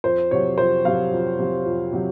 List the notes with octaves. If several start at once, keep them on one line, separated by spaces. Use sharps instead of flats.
F2 C5
C3 F#3 C#5
F2 C5
C3 F#3 F5
F2
C3 F#3
F2
C3 F#3